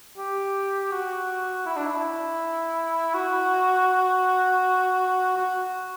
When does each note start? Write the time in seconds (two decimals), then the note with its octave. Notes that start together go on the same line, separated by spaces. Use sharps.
0.18 G4
0.92 F#4
1.66 E4
1.77 D4
1.86 E4
3.15 F#4
5.37 F#4